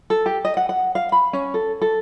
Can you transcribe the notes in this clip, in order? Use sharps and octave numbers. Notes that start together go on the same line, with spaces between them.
A4
G4
D#5
F#5
F#5
F5
B5
C#4
A4
A4